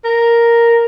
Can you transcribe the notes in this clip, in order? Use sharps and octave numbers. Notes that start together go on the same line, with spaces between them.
A#4